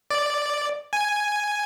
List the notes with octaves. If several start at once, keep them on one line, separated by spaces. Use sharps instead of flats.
D5
G#5